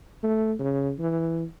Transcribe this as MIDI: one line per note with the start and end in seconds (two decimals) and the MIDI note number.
0.23 0.53 57
0.59 0.92 49
0.99 1.44 52